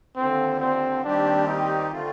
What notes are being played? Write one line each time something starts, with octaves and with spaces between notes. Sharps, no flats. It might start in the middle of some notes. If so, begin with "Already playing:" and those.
D#2 D3 F3 C4
C4
D#2 D#3 G3 C4 D4 G4
D#4
D3 A3 C4 F4